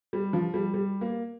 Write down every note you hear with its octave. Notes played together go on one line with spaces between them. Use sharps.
G3
F3
G3
G3
A#3